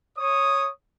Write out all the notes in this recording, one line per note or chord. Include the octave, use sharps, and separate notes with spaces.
C#5 D#6